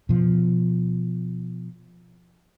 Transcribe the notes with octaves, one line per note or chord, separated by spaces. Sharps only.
B2 F3